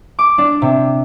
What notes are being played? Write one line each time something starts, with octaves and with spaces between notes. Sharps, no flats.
D6
D4
C3